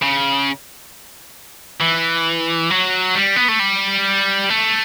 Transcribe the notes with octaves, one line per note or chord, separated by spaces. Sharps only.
C#3
E3
F#3
G3
B3
A3
G3
A3